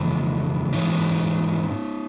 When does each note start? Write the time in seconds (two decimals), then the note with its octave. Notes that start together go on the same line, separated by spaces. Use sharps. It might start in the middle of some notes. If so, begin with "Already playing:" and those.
Already playing: F2 C#3 E3 G#3 A#3
0.73 G#2 E3 C#4 D#4